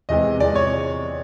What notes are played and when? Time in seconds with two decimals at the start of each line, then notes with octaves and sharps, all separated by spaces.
0.09 E2 C3 E3 G#3 D#5
0.40 E2 C3 E3 G#3 D5
0.55 C#5